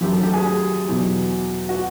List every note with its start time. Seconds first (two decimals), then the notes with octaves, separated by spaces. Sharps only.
0.01 F#2 D#3 F#3 G4
0.12 A4
0.23 G4
0.34 G#4
0.45 G4
0.88 E2 B2 F#3
1.69 F#4